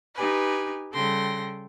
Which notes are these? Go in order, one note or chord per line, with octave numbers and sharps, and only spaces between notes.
D#4 G4 B4 G#5
C#3 G3 A4 G5 C6 A#6